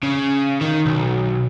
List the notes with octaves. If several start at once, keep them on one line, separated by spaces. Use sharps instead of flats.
C#3
D#3
B1